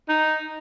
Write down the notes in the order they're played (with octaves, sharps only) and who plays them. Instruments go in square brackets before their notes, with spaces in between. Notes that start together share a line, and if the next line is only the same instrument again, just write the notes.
[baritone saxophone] D#4